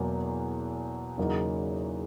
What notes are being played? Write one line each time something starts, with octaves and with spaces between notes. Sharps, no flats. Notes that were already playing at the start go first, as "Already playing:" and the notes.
Already playing: E2 B2 F#3 A#3
E2 C#3 F#3 A#3 D#4